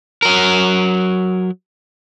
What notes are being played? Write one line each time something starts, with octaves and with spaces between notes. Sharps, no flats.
F#3 A#4